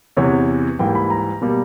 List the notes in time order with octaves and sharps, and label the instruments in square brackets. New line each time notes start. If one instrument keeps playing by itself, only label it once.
[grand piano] E2 C3 E3 C#5
G#2 E3 G3 A#3 G5
B5
A#5
B2 G3 A#3